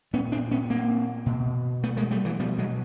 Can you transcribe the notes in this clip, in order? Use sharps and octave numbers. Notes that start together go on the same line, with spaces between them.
A#2 B3 C#4
C4 D4
B3 C#4
A#3 C4
B2
A3 B3
G#3 A#3
G3 A3
E3 F#3
B2 F3 G3
F#3 G#3